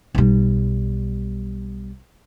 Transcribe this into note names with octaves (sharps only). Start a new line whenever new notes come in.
B1 G3